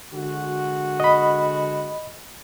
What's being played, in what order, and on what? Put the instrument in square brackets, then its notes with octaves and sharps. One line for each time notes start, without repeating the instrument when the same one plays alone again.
[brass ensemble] D3 G#3 F#4
[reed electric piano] D#5 B5